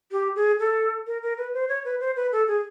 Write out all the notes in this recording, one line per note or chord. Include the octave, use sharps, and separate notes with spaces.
G4
G#4
A4
A#4
A#4
B4
C5
C#5
B4
C5
B4
A4
G#4